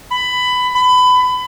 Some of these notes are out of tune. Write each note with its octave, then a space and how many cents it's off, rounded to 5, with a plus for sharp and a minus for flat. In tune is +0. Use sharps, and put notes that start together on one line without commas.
B5 +15
B5 +25